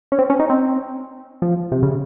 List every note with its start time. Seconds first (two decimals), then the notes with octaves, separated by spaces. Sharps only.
0.12 C#4
0.19 C4
0.30 C#4
0.40 D#4
0.50 C4
1.42 F3
1.72 C3
1.83 C#3